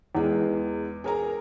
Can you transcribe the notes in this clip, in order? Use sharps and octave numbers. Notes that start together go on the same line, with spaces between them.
E2 G#3
G#4 A#4 A#5